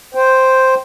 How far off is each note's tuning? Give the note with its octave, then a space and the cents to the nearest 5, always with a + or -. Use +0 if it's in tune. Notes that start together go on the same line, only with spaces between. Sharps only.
C5 +0 G5 +0